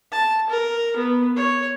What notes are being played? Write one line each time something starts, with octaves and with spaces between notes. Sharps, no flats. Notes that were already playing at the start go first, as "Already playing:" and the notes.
A5
A#4
B3
C#5